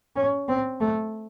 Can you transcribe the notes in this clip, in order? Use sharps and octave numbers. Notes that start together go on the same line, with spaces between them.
C#4
C4
A3